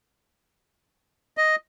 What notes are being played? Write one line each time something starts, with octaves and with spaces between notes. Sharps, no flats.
D#5